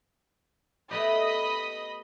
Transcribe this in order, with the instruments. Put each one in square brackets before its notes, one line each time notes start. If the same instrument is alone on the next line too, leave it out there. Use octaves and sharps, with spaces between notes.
[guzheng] A3 B3 G4 [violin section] D#5 B5 D#6